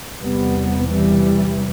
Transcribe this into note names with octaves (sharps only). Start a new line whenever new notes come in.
E2 C3 G3 B3
E3 G3